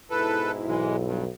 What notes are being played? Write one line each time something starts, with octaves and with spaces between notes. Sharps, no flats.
G#2 B2 E4 A4 B4
B1 E3 G#3
G2